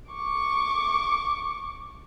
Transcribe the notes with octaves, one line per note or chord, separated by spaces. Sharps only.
C#6 D6